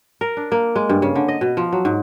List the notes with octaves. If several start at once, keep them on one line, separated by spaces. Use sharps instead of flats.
A#4
D4
A#3
G#3
G2
C#3
D3
D#5
B2
F3
F#3
G#2